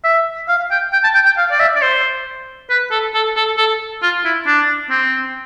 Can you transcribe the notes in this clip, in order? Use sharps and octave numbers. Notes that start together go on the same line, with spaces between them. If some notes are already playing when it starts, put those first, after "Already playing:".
E5
F5
G5
G5
A5
G5
G5
F5
D5
E5
D5
C5
B4
A4
A4
A4
A4
F4
E4
D4
C4